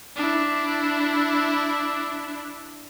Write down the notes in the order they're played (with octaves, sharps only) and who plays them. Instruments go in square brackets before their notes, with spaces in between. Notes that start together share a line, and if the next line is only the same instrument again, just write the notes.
[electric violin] D4 E4